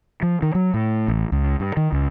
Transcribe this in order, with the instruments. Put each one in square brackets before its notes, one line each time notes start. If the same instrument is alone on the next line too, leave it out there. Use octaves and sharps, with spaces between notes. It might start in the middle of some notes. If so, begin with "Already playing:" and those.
[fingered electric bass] F3
D#3
F#3
A2
A1
C#2
G2
D#3
C#2